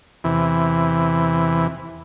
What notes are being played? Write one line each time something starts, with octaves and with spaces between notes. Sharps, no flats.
E2 C3 E3